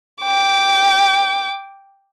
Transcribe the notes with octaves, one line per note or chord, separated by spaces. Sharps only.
G5 D6